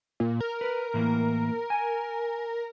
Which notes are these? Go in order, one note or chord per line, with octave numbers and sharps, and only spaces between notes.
A#2
A#4
B4
A2 E3 A#3
G#5